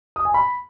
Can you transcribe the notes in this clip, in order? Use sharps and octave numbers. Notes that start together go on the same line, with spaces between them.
D#6
G#5
B5